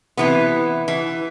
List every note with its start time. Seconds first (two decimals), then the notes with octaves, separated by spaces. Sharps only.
0.17 C3 E3 B3
0.88 E3